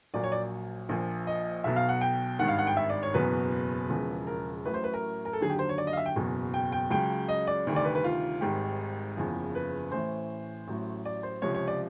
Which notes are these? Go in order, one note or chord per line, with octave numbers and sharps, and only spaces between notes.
A#1 A#2 F#3 D5
C#5
D5
A#1 A#2 F3
D#5
B1 B2 F#3 E5
F5
F#5
G5
G#1 G2 D#3 F#5
F5
F#5
G5
E5
D5
C#5
F#1 E2 B2 F#3 B4
E1 E2 C#3 F3
A#4
A1 A2 F#3 B4
C5
B4
A#4
A#4
A4
D#2 D3 F#3 G#4
G4
C5
C#5
D5
D#5
F5
E5
G5
F#1 E2 B2 F#3
G5
G5
C#2 C#3 F#3 G5
D#5
D5
D2 C3 D#3 G3
D5
B4
B4
F4
G#1 G#2 D#3 G3 G4
F#1 E2 C#3 F3
B4
A1 A2 E3 C5
A1 A2 F#3
D5
C5
C#2 C3 F3 C#5
C#5
D5